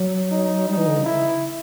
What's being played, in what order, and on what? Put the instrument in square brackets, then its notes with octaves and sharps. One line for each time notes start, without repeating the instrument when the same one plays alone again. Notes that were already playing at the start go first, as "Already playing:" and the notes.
Already playing: [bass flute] F#3
[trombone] D#4
[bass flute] G3 [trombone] D#4
[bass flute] E3
D3
C#3
[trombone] E4